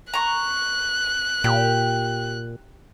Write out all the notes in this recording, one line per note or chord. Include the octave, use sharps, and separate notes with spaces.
A#5 C#6 F#6
A#2 G4